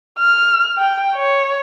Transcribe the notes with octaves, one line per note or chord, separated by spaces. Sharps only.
F6
G5
C#5